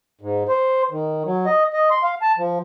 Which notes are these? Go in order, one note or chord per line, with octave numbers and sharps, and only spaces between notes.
G#2
C5
D#3
F#3
D#5
D#5
C6
F5
A5
F3